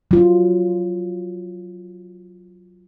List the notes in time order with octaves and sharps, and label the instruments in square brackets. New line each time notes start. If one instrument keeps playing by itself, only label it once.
[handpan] F#3 F4